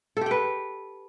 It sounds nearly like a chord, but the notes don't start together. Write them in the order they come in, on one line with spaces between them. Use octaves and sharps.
A4 G4 G5 B4